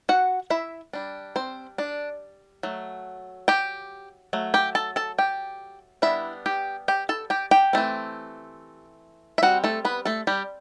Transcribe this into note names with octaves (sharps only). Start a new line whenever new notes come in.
F#4 F#5
E4 E5
G3 D4
C4 C5
D4 D5
F#3 A3
G4 G5
F#3 A3
G4 G5
A4 A5
A4 A5
G4 G5
G3 B3 D4 E4 E5
G4 G5
G4 G5
A4 A5
G4 G5
G4 G5
E3 A3 C4
E5
G3 C4 F#4 F#5
A3 A4
B3 B4
A3 A4
G3 G4